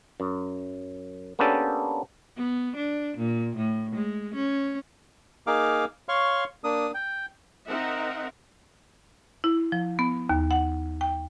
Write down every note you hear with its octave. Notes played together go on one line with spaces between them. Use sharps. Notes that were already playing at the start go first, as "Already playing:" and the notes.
F#2
A#3 B3 C#4 D4 G4 A4
B3
D4
A#2
A2
G#3
C#4
A#3 D#4 G#4 F5 D6
C#5 F5 C6 C#6
A#3 D4 D#6
G5
C4 D#4 A#4 E5 F#5
E4
F3
B3
D#2
F#5
G5